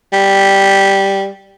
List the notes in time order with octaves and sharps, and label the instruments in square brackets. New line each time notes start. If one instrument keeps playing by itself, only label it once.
[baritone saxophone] G3